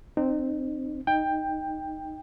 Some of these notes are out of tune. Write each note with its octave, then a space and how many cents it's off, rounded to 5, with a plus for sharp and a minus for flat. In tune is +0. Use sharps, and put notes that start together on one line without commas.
C4 +0 D#4 -35
D#4 +0 G5 +15